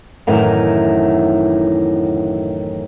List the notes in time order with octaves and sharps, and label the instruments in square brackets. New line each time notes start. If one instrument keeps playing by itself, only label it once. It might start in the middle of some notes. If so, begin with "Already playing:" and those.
[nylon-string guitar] F#2 A2 D#3 E3